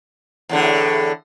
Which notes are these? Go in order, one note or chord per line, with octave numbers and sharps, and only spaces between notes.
E2 A2 D3